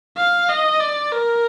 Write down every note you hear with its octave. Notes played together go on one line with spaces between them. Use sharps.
F5
D#5
D5
A#4